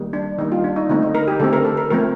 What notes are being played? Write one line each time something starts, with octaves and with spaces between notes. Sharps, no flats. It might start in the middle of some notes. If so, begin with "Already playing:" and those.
Already playing: D#3 G3 A#3
D4
D#3 G3 A#3 D#4
F4
D4
D#4
D3 A3 C4 D#4
D#4
A#4
G4
D3 A3 C4 A4
A#4
A4
A#4
F3 A3 C4 A#4